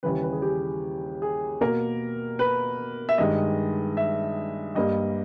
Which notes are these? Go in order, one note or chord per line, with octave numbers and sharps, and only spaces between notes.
D#2 C#3 E3 G3 B4
B4
G#4
G4
G#4
B2 A#3 A#4
B4
E5
G2 D#3 G#3 D#5
E5
G2 G3 A#3 D#5